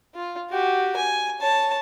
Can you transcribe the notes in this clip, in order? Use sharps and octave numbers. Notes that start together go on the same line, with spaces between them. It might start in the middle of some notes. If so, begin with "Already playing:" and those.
F4
F#4 G4
G#5
C#5 A5